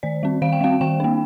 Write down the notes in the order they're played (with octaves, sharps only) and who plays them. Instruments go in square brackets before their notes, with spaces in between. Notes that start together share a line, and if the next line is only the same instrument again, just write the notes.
[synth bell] D#3 D5
G3 C4
D#3 F5
G5
G3 C4 F5
D#3 G5
A#3 D4